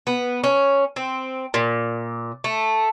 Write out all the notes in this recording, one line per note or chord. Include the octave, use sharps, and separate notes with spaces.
B3
C#4
C4
A#2
A3